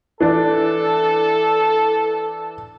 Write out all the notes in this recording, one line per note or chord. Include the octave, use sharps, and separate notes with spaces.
E3 D4 A4 D5